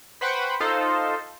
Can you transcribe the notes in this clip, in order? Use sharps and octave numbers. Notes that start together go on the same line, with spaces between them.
B4 C5 F#5 G5 B5 C#6
D#4 F4 A4 C5